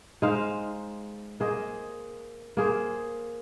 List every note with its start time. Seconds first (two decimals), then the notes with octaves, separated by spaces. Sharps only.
0.22 G#3 D#4 C5 F5
1.40 A#3 G#4 C5 D#5
2.57 A#3 G#4 C5